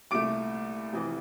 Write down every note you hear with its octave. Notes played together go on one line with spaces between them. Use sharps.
C2 A#2 A3 D6 D7
F1 F2 E3